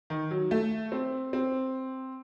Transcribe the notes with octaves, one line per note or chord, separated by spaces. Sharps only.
D#3
F#3
A3
C4
C4